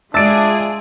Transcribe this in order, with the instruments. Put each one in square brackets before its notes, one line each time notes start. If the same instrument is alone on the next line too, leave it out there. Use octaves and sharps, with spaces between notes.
[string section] G#3 F4 G#4 [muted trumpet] D4 [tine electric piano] E5 E6 [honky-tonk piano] A6 D7